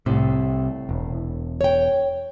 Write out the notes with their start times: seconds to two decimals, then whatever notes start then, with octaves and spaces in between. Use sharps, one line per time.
0.06 C2 A2 C3
0.89 E1
1.61 C#5 G5